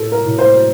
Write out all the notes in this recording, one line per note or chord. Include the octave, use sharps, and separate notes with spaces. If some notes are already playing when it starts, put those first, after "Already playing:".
Already playing: A2 A4
A#4
A2
C5